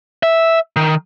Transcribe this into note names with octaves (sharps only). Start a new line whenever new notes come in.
E5
D#3